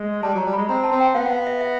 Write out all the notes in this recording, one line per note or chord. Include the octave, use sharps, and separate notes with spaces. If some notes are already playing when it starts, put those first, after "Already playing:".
Already playing: G#3
G3 A5
F#3 A#5
G3
G#3 B5
C4 A#5
A5
C4
G5
B3 F5
F#5
F5
E5
E5